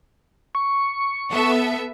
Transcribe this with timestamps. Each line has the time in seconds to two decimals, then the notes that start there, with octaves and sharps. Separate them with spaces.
0.55 C#6
1.31 B3 A4 E5